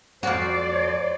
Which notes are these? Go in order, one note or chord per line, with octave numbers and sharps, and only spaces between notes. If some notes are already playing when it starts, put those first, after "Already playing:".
F2 F#4 C5 D5